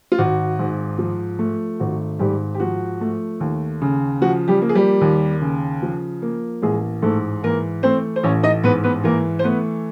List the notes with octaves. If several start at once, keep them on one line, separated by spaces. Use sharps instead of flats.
F4
G#1 F#4
G#2
F3
A3
G#1 F#4
G#2 G3 G4
G4
F3 F#4
A3
D#2
C#3
F3 F#4
G3 G4
A#3
G#4
G3 G4
D#2
C#3
F3
A#3
A1 G#3 G#4
G#2 A3 A4
E3 A#3 A#4
A3 C4 C5
C5
A1 C#4 C#5
D#4 D#5
G#2 B3 B4
B3 B4
E3 A#3 A#4
C5
A3 B3 B4